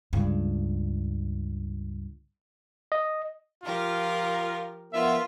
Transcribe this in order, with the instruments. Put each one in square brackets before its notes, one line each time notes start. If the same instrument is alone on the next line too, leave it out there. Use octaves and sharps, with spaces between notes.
[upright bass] C#2 G2
[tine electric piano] D#5
[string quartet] F3 G4 A#4 [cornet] F4
[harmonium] F3 B3 A#4 [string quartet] F4 [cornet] E5